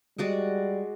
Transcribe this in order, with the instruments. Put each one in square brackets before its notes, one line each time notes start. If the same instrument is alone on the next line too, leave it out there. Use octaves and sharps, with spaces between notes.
[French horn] G3 [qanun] G#3 F#4 D5